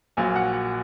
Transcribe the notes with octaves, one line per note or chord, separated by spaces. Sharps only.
A#1 A#2 F#3 A#3 G#5
F#5
F#5